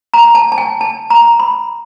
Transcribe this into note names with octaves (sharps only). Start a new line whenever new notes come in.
A#5
A5
A5
G#5
A5
A#5
B5